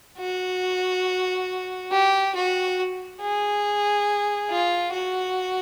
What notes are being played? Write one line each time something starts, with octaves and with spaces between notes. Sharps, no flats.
F#4
G4
F#4
G#4
F4
F#4